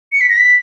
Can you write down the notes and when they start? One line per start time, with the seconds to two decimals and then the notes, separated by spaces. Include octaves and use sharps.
0.12 C#7
0.21 B6
0.29 A#6
0.37 B6